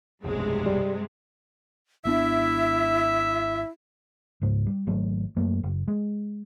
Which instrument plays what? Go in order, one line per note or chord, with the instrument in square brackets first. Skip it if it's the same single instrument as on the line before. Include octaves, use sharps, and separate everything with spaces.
[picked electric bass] F1 B1 [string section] G2 C3 G#3
[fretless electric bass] G3
[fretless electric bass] G#1 B3 D4 [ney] E4 [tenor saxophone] E5
[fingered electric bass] C#2 G#2
G3
G#1 F#3 A3
F#2 F#3 A3 A#3
F#1
G#3